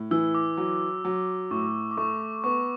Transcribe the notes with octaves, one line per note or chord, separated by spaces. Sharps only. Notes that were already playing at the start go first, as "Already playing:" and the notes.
Already playing: A2
E3 E6
D6
F#3
F#3
A2 C#6
D6
A3 C#6
B3 C#6